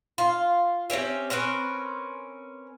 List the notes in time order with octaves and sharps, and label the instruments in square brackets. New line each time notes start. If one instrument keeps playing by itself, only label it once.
[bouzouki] F4
C4 C#4 G4 E5
C4 C#4 A#4 B4